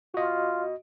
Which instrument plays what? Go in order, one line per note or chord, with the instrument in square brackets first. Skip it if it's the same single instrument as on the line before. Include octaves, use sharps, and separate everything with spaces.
[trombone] F4 [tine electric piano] F#4 D#5